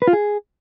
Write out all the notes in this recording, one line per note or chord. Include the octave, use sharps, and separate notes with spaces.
B4
F4
G#4